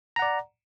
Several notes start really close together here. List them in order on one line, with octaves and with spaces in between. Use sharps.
A#5 F#5 D5